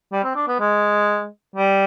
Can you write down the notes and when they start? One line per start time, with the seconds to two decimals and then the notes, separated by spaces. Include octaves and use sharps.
0.12 G3
0.24 C4
0.36 D4
0.48 B3
0.60 G#3
1.56 G3